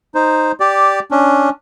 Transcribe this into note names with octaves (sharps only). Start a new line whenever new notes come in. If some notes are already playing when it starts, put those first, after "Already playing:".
D#4 C5
G4 D5
C#4 D4